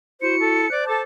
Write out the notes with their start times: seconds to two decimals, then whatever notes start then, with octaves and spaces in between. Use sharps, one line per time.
0.22 E4 F#4 C5 C#7
0.40 A4
0.70 C5 D5 F#6
0.87 A4 A5 D6